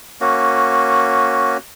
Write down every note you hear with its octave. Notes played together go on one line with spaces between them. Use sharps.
A#3 C#4 F#4